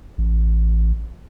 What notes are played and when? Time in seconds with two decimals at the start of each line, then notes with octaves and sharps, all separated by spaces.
0.18 A1